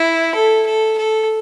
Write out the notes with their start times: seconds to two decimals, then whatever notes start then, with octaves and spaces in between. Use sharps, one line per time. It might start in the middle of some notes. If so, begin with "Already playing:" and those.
Already playing: E4
0.35 A4
0.66 A4
0.98 A4